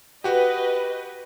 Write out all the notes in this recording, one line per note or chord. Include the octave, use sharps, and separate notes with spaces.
F#4 G4 B4 D#5